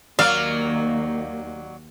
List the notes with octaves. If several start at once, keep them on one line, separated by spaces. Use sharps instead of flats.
D#2 F#3 A#3 D5 F5